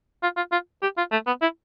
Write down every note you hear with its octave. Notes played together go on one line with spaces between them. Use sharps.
F4
F4
F4
G4
F4
A3
B3
E4